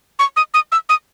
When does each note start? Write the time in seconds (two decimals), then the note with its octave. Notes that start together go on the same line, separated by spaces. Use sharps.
0.19 C#6
0.36 D#6
0.54 D#6
0.72 E6
0.89 D#6